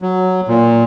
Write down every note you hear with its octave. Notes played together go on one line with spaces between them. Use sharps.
F#3
A#2